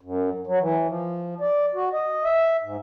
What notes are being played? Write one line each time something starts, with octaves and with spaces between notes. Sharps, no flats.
F#2
F#3
E3
F3
D5
F#4
D#5
E5
G#2